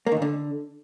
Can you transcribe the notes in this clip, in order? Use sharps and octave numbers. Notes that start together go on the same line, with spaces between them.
A#3
D#3
A#2
D3